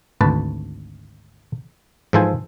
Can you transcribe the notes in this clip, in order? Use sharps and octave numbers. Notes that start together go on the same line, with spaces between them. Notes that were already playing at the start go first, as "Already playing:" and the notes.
G#1 D2 B4 A5
G#2 E3 F3 A4 C5 G#5